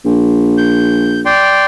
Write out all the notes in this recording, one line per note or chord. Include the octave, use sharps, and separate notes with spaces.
A#1
G6
D5 G5 C6